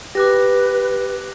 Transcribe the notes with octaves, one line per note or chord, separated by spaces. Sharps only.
G4 B4 D6 F#6 A#6